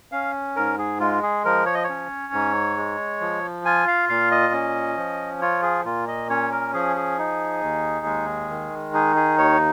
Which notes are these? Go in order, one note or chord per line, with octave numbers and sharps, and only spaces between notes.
C#4 F5
G#2 A#4
G#4
G#3 F4
G#4
F3 A#4
C#5
D#5
C#5
C#4
G#2
G#3
F3
F4 G#5
F5
A#2 F5
D#5
C#4
F3
F4 C#5
G#4
A#2 F4
D#5
C#4 C#5
A#4
F3 G#4
G#4
D#4
D#2
G#3
D#3
D#4 G#4
G#4
D#2 C#5